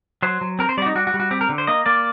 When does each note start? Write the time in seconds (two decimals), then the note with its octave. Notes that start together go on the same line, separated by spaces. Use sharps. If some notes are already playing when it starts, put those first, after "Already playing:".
0.23 F#3 C5
0.41 F#3
0.59 C4 A#4
0.69 C5
0.77 G3 D5
0.82 F#4
0.86 D#4
0.95 G3 F#4
1.07 F#4
1.14 G3
1.20 F#4
1.31 C4 G4
1.41 A#4
1.49 D3
1.58 C5
1.67 A#3 D#5
1.86 A#3 D5